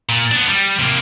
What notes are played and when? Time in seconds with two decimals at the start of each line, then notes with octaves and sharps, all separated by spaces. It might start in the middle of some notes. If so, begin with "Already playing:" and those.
0.09 A#2
0.31 B3 D4
0.49 G3
0.79 C3 A#3